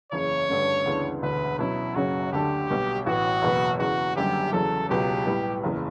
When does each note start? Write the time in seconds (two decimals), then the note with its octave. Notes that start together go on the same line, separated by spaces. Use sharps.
0.12 F#1 E2 C#3 C#5
0.49 G2 D3 A3 C#4
0.86 D2 C#3 E3 B3 D4
1.22 E1 D2 D3 B4
1.59 B2 F#3 C#4 E4
1.96 F#1 F#2 C#3 F#3 C#4 F#4
2.33 D2 D3 A3 D4 G4 A4
2.69 B1 B2 G3
3.06 A1 A2 E3 B3 F#4
3.42 F#1 E2 B2 F#3 B3
3.79 E2 C#3 E3 F#4
4.16 F#1 F#2 D3 G3 G4
4.52 E2 C#3 F#3 A4
4.89 C#2 B2 F#3 G4
5.26 A2 G3 B3
5.63 F#1 E2 C#3 E3